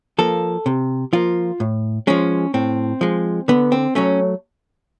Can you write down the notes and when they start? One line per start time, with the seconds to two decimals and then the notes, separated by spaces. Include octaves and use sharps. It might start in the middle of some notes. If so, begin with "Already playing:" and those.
0.18 F3 A#3 A4
0.66 C3
1.13 F3 A#3 F4
1.60 A2
2.07 F3 G#3 C#4
2.54 A2 C4
3.01 F3 G#3
3.48 D3 B3
3.72 C4
3.95 F#3 A3 C#4